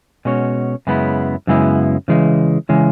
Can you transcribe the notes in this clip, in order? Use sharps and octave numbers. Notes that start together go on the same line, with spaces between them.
B2 G#3 C#4 F#4 C#5
F#2 C#3 G#3 B3 E4
F#2 C#3 G#3 B3 E4
C#3 E3 G#3
C#3 E3 G#3